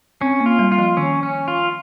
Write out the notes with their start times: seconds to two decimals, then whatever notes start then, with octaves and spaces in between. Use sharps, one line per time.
0.21 C4 C#4
0.40 A#3
0.46 F4
0.59 G3
0.72 F4
0.79 F3
0.97 D#3 C#4
1.23 C#4
1.48 F4